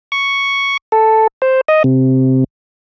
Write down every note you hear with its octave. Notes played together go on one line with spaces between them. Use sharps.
C#6
A4
C5
D#5
C3